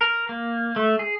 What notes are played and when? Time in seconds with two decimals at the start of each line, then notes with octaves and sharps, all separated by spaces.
0.01 A#4
0.29 A#3
0.76 A3
0.99 G#4